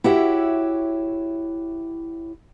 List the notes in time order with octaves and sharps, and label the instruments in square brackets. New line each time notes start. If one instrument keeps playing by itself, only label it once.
[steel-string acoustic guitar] E4 F#4 G4 C#5 E5